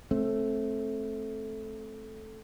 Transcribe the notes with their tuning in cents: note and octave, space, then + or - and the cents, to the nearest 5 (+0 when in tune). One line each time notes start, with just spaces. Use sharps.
A3 -10 C4 +20